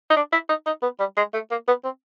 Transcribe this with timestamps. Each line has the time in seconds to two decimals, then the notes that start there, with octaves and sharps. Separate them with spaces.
0.10 D#4
0.17 D4
0.32 E4
0.49 D#4
0.66 D#4
0.83 B3
0.99 G3
1.17 G#3
1.34 A3
1.51 A#3
1.68 B3
1.84 C4